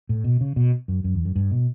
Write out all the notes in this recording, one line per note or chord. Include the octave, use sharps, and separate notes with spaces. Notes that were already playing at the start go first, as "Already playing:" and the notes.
A2
B2
C#3
B2
F#2
F#2
E2
F#2
G2
B2